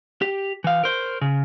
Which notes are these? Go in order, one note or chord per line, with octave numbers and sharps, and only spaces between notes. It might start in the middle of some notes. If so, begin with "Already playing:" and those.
G4
E3 F5
A#4 C5
C#3